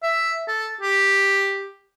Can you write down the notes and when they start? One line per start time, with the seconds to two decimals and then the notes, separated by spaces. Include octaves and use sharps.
0.03 E5
0.48 A4
0.81 G4